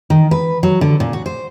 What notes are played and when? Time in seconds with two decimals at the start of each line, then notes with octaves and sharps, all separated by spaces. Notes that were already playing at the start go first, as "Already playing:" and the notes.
0.10 D#3
0.31 B4
0.63 F#3
0.81 D3
1.00 A#2
1.13 F#4
1.26 C5